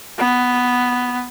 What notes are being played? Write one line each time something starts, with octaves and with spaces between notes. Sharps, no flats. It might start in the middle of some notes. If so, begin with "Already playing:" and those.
B3